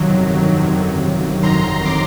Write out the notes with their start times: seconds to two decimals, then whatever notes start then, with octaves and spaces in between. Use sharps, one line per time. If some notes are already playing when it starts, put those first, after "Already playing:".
Already playing: G1 F2 C3 D#3 F#3
0.57 G1 F2 C3 D#3 F#3
1.43 G1 F2 C3 D#3 F#3 A#5 C6
1.86 C6 D6